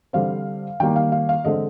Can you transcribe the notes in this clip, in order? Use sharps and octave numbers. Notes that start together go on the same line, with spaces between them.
D3 G3 C4 F5
D#3 G3 A#3 G5
F5
F5
F5
D3 G#3 C4 D#5